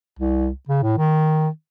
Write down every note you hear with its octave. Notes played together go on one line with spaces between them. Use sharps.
C2
C#3
A2
D#3